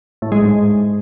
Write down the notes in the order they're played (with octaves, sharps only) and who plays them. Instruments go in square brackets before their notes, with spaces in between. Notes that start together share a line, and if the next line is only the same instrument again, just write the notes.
[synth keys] A2
G#3
G#2